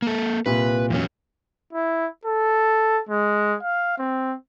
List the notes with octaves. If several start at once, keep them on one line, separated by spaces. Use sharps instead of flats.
A#3 A4
C2 A#2 B4
E2 F#3 C#4
E4
A4
G#3
F5
C4